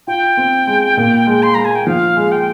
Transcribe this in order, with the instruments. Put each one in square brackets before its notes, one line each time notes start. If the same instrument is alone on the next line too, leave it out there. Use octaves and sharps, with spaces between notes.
[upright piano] F4 [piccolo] G5
[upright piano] C4
G#3
A#2
G#3
[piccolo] C6
[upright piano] G#3 [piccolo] A#5
[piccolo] G#5
G5
[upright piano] F3 [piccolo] F5
[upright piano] G#3
[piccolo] G5